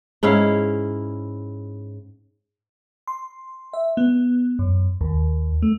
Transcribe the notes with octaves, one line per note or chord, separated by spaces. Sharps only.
G#2 C#4 E4 F5
C6
E5
B3
F#2
D#2
A3